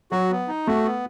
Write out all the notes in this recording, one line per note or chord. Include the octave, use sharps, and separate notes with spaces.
F#3 F#4
B3
D#4
A3 F#4
B3